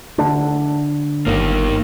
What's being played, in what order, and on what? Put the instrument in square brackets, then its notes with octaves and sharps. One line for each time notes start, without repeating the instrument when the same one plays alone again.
[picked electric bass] D3 A3 D4
[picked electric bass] G1 [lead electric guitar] D#3 A#3